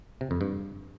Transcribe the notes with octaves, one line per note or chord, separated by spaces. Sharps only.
C3
F2
G2